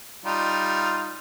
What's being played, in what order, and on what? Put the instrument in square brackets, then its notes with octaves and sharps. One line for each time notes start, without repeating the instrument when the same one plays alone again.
[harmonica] G3 D#4 F4